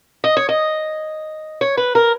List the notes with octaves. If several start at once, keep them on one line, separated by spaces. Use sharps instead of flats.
D#5
C#5
D#5
C#5
B4
A#4